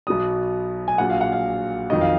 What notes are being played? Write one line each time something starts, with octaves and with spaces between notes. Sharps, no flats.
B1 B2 F#3 D#6
G#5
A#1 A#2 F#3 F#5
F5
F#5
F5
F2 D#3 F#3 D#5
F5